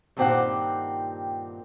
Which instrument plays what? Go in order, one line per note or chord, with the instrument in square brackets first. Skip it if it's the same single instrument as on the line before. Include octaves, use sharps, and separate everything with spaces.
[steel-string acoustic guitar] G2 A#2 D#3 C4 G4 F#5